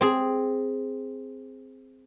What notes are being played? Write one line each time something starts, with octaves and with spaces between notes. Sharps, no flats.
C4 G#4